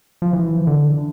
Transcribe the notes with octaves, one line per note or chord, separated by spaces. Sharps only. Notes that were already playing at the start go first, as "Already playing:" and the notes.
F3
E3
D3